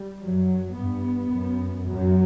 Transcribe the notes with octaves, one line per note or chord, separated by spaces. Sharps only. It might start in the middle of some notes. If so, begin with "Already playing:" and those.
Already playing: G3
F#2 F#3
G2 B3
F#2
F#2 F#3